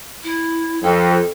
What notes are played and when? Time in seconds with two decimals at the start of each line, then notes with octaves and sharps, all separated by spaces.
0.24 E4
0.83 F2 A4